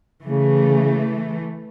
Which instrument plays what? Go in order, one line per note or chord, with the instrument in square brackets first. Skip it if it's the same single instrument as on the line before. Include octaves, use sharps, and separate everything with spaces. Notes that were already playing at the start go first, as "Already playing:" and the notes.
[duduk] C#3 [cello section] E3 A3